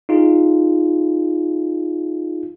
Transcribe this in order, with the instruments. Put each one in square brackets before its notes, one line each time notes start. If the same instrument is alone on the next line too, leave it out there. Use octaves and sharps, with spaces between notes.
[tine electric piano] D#4 F4 G#4